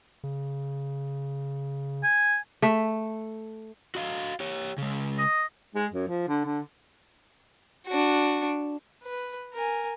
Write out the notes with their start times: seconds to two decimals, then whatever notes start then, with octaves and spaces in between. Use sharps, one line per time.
0.24 C#3
2.03 G#5
2.62 A3 E5
3.95 F#4 D#5 F5
4.40 G4 C#5
4.78 C#3 G#3
5.18 D#5
5.75 G#3
5.93 F#2
6.08 F3
6.28 D3
6.45 D3
7.88 D4 F#4
9.03 B4
9.53 A#4 G#5